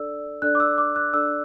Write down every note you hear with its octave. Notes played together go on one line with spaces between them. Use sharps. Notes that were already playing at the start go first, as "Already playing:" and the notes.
Already playing: D4 A4 D5 E6
D4 A4 D5 F#6
D6
E6
D6
F#6
D4 A4 D5 E6